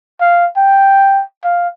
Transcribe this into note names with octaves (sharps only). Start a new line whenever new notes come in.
F5
G5
F5